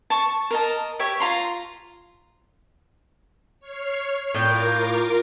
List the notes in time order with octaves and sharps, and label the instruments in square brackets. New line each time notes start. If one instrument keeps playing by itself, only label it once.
[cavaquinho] A5 C#6
A#4 D#5 A5
G4 C#5 E5
F4 A#5 C6
[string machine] C#5 F6 C7
[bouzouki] A2 G5 [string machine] F4 A#4 D6